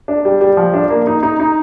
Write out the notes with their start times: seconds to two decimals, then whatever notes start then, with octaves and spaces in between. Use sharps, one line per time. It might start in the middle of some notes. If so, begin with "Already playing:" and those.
0.08 D4
0.25 G3
0.41 G3
0.57 F3
0.74 D4
0.90 A#3
1.07 D#4
1.23 D#4
1.40 D#4